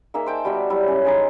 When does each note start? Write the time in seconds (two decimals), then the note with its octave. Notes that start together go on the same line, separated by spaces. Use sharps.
0.14 A#3 D#4 G#4 E5
0.26 C5 G5 A5
0.45 G3 B3 F#4 E5
0.70 F#3 G3 E4
0.87 C#4
1.05 G#3 D#4